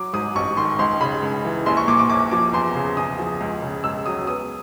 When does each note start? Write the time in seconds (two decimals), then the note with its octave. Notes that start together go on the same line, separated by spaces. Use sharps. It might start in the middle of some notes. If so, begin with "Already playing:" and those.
Already playing: F#3 D6
0.13 G#2 D#6
0.35 A1 C#6
0.57 D#3 C6
0.79 C#2 C6
1.01 C#3 B5
1.22 C#2
1.44 E3
1.66 A#1 C6
1.77 C#6
1.88 A#2 D6
1.99 D6
2.10 A#1 D6
2.31 F3 D6
2.53 E2 C6
2.75 C#3
2.97 E2 D#6
3.19 F3
3.41 C#2
3.62 C#3
3.84 C#2 E6
4.06 F#3 D#6
4.27 B3 D#6